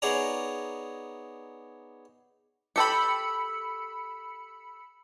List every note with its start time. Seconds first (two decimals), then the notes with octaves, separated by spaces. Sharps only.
0.02 B3 D#4 G#4 C#5 D5 A#5
2.76 G4 A4 G5 B5 E6 C#7